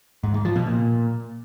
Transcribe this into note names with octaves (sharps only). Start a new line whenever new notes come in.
G#2
G#2
F3
B2
A#2